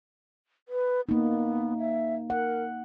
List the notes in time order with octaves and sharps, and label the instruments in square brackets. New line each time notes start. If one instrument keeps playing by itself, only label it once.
[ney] B4
[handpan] A#3 D#4 [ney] B3
[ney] E5
[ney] A#4 [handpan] F#5